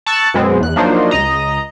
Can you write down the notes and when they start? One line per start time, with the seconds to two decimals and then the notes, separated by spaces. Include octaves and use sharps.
0.06 A5 C#6 E6 F#6 A6
0.34 F#2 B2 G#3 B3 C4
0.60 E2 F#6
0.76 F3 F#3 A#3 D4 D#4 C5
1.11 C#2 D#5 A#5